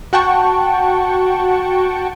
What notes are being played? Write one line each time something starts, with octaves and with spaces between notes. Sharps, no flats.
F#4 F#5 G5 A5 C#6